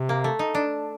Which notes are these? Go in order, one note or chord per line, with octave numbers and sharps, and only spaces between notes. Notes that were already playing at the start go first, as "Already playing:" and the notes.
Already playing: C3
A#3
A3
D#4
D4